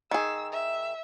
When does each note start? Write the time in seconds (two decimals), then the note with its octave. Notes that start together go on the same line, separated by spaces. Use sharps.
0.11 D#3 G#4 E6
0.52 E5